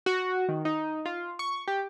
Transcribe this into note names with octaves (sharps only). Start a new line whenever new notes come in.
F#4
D#3
D#4
F4
C#6
G4